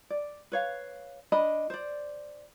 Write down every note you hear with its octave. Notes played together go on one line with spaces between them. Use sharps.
D5
B4 C#5 F5
D4 D#5 B5
C5 D5